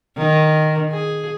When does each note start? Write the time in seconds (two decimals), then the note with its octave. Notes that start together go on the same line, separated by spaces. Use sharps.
0.17 D#3
0.91 G#4